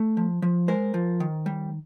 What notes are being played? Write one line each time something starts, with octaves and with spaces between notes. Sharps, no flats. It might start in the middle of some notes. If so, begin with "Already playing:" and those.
Already playing: A3
F3
F3
G#3 A#4 C5
F3
D#3
G3